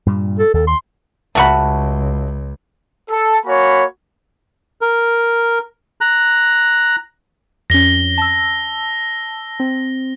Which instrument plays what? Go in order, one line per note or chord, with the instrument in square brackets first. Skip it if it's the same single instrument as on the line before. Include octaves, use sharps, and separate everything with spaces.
[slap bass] G2 A#2 G3
[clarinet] A4
[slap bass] D#2 [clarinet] A4
[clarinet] C6
[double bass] C#2 [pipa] A3 F#4 B5
[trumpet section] A4
A#3 F#4 C#5 G#5 B5
[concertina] A#4
A#5 F#6
[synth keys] F2 C#4 [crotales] A#6 G7
[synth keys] A5 E6
C4